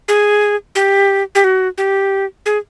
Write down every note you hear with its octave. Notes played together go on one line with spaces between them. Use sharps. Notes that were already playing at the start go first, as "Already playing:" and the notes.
G#4
G4
G4
F#4
G4
G#4